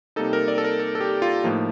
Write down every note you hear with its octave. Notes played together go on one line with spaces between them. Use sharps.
C3 G3 A#3 D#4 A4
A#4
D5
A4
A#4
A4
A4
G4
F4
A2 F3 A#3 D#4